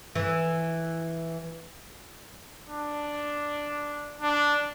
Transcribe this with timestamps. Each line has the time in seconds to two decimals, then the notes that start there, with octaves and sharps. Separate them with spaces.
0.15 E3
2.68 D4
4.21 D4